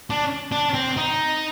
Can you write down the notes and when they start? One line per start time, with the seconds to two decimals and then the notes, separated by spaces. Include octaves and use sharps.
0.10 D4
0.52 D4
0.74 C4
0.97 D#4